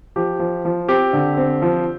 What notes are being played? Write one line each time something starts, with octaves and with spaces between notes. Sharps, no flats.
F3 G4
F3
F3
C4 G4
D3
C4
F3